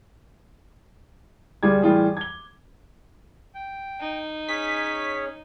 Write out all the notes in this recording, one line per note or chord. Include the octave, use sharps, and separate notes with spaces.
D1 G3 F4 G#4 D6 G#6
A2 E3 G3 F4 G4 G#4
G#6 G7
G5
D#4
C#4 G#4 C#5 B6